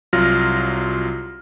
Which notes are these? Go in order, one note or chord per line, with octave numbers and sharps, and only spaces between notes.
C2 F#3 F4 F6 A#6